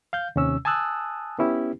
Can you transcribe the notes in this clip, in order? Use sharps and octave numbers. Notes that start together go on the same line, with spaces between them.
F5 G6
D#2 C3 C#4 E6
G#5 A5 D#6 E6 F#6
B3 C#4 E4 G4